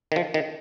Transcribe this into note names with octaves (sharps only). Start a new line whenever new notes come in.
D#3
F3
D#3